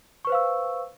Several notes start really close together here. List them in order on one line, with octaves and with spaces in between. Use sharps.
C#6 B4 C5 F5 E6